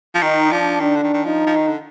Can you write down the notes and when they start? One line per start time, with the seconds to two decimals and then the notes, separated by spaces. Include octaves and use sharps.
0.15 F3
0.21 D#3 D#4
0.51 F3 D4
0.80 D#3 D4
0.96 D3
1.03 D#3
1.14 D#3
1.25 F3 D#4
1.47 F3
1.56 D#3
1.67 D3